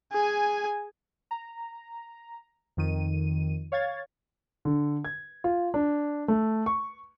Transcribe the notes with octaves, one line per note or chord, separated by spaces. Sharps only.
G#4 G#5
A#5
F2 D#3 D#7
C#5 F5 G#6 A6
D3
G#6
F4
D4
A3
C#6